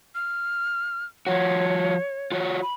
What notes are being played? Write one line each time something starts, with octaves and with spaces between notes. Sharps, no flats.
F6
F3 F#4 C#5
F4 F#4 C#5
B5